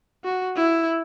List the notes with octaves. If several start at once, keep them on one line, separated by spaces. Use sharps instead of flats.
F#4
E4